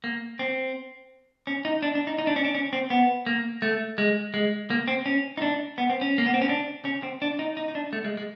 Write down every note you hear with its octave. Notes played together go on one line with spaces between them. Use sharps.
A#3
C4
C#4
D#4
D4
D4
D#4
D#4
D4
C#4
D4
C#4
C4
B3
A#3
A3
G#3
G#3
A#3
C4
C#4
D#4
D4
B3
C4
C#4
A#3
B3
C4
C#4
D4
C#4
C4
D4
D#4
D#4
D#4
D4
A3
G#3
G#3